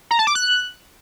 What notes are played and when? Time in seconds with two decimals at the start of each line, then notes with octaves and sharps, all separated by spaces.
0.11 A#5
0.19 A5
0.27 D6
0.35 F#6